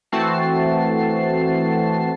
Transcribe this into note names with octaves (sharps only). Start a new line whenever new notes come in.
E3 A3 C4 F#4 A5 C7